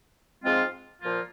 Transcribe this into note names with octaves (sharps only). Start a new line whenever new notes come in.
G#2 F3 G#3 C4 F4
A#2 F3 A#3 F4